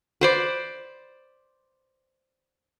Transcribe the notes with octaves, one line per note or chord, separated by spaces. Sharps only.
B4 C5 D5